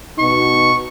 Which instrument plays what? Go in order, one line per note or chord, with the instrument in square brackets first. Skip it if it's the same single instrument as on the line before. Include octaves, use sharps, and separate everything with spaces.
[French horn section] B2 D#4 [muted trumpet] C#6